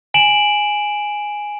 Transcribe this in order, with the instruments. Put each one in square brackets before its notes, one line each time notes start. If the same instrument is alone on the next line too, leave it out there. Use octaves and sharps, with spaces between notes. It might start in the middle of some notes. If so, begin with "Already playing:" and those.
[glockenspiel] G#5 D7 E7 F#7